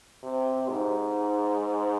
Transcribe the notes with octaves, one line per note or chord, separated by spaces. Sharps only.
C3
G#2